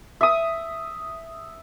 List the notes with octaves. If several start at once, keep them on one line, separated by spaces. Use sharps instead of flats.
E5 D#6